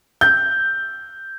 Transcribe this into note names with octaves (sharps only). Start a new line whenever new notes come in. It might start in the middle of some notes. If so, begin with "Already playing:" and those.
G6